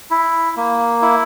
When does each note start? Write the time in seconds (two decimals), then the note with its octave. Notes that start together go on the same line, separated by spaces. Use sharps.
0.11 E4
0.57 A#3
1.02 E4